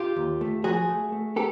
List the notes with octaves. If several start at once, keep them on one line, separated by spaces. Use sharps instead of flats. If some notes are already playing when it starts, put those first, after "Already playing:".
Already playing: F4 G4
D#2
A3
F3 F#4 G#4
A3
A3
G4 A4